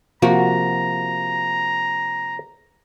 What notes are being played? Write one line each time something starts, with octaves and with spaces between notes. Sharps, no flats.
C3 F3 A#3 F#4 A#5